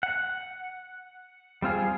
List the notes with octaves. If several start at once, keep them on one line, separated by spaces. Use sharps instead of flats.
F#5
G3 C4 F4 G#4